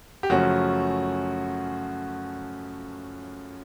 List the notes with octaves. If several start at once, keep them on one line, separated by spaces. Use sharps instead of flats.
G4
F#2 C#3 F3 A3 C#4 F#4